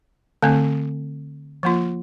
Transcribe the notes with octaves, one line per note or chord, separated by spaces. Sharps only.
D3 A3 C4
F3 A#3 F4